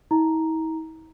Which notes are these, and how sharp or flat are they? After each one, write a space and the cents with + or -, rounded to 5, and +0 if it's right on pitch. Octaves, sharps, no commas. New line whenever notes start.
E4 -45 A#5 +0